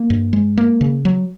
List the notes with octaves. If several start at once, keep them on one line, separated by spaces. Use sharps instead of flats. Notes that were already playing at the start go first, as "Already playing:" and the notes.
Already playing: A#3
G2
G#3
A#3
C#3
F#3